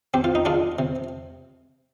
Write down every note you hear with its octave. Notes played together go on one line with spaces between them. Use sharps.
C4 G4
F4
D#4
G#3 D4 F4
C3